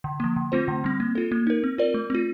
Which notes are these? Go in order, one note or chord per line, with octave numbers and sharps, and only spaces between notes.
D3
F3 A#3
D3
A3 C4 F4 C5
D3
G3 C4
A#3
F4 A4
A#3
D#4 A#4
C4
F4 A#4 D5
A3
C4 F4